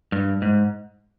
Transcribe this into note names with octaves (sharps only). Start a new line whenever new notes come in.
G2
G#2